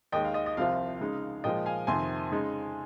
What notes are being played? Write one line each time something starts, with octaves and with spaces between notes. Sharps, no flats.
D#2 D#3 G#3 D#5 G5
F5
D#5
D#5
C2 C3 F3 C4 F4 F5
C#3 G#3 D#4
A#2 F3 G#3 D#5 G5
F5 G#5
F2 C3 D#3 G#5 C6
C#3 G#3 D#4